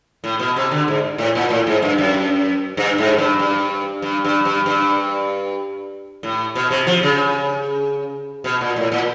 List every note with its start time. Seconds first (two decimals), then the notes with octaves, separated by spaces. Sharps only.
0.24 A2
0.40 B2
0.56 C3
0.71 D3
0.88 G#2
1.18 A2
1.35 A#2
1.50 A2
1.67 G#2
1.82 G2
1.98 F#2
2.77 G2
2.98 G#2
3.18 G2
3.39 G2
4.02 G2
4.24 G2
4.45 G2
4.66 G2
6.23 A2
6.55 B2
6.71 C3
6.87 F3
7.03 C#3
8.44 B2
8.61 A#2
8.76 A2
8.92 A#2